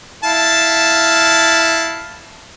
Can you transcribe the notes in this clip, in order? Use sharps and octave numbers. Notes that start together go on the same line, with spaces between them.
E4 F5 A5